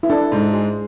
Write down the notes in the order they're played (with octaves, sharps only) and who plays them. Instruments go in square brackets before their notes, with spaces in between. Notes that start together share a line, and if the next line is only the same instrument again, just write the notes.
[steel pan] E4
[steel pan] D4 [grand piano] A4
[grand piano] G#2
G#3